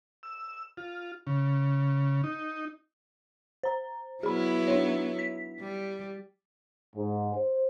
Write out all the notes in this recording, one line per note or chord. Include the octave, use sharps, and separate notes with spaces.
E6
F4
C#3
D#4
C5 A#5
F#3 B3 E4 G#4 B5
D4 D#4 C#5
B6
G3
G#2
C5